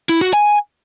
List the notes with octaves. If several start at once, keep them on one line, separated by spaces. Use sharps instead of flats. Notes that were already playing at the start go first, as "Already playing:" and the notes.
E4
F#4
G#5